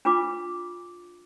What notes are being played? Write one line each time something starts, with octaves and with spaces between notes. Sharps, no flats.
D4 F4 B4 D6